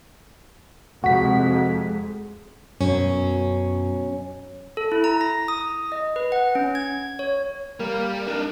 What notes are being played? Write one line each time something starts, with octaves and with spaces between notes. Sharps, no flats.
F2 C3 G#3 F#4 B6
F#2 B2 F#3 C#4
A4
E4
A#5
A#6
D#6
D#5
B4
F#5
C#4
G#6
C#5
G3 A#3
D4 D#4 A#4